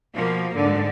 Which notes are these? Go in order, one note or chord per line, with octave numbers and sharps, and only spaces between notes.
B2 F3 A#3
G#2 D3